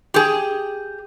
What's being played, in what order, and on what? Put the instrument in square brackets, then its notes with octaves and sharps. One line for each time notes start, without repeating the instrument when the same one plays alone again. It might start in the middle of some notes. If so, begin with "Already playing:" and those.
[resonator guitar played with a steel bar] G4 G#4